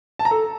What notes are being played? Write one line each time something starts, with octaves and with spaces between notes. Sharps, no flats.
A5
A#5
A4